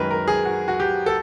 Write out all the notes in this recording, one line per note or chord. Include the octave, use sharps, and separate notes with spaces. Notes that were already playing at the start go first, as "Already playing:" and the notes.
Already playing: F#2 D#3 G#3 A#4 B4
A#4
G#4
F#4
F#4
G4
A4